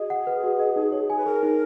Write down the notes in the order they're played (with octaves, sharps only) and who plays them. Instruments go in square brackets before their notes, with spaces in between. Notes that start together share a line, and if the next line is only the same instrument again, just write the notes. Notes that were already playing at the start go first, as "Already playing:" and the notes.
Already playing: [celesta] F#4 D#5 [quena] G#4
[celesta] F#5
B4
F#4
D#5
D#4
C#5
G#5
[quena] B4
[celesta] G#4 [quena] A#4
[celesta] D#4